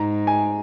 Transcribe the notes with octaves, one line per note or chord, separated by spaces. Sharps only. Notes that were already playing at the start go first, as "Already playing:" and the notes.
Already playing: G#2 A#5
G#5